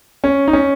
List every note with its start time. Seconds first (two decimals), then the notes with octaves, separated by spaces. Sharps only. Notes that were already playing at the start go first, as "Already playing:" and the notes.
0.24 C#4
0.48 D#4
0.53 C#4